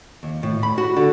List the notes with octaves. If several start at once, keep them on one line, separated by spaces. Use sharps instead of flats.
D#2
A2
B5
F#4
D3